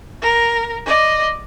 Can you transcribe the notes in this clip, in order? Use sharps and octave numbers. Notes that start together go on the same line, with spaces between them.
A#4
D5 D#5